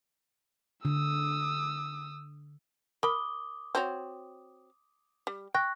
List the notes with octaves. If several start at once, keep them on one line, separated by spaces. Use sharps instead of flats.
D3 D#6 E6
A#4 B5 D6 D#6 G7
C4 F#4 C#5
G3
G5 C#6 F#6 A#6